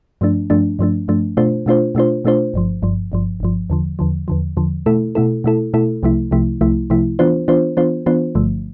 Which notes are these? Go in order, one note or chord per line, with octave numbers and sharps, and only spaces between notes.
G2 F3 A3 D4
G2 F3 A3 D4
G2 F3 A3 D4
G2 F3 A3 D4
B2 A3 D4 F4 C5
B2 A3 D4 F4 C5
B2 A3 D4 F4 C5
B2 A3 D4 F4 C5
G1 G2 F3
G1 G2 F3
G1 G2 F3
G1 G2 F3
E2 D3 F3
E2 D3 F3
E2 D3 F3
E2 D3 F3
B2 A3 E4 A4
B2 A3 E4 A4
B2 A3 E4 A4
B2 A3 E4 A4
C2 C3 F3 A3 E4
C2 C3 F3 A3 E4
C2 C3 F3 A3 E4
C2 C3 F3 A3 E4
E3 B3 D4 F4 C5
E3 B3 D4 F4 C5
E3 B3 D4 F4 C5
E3 B3 D4 F4 C5
G1 G2 D3 F3 A3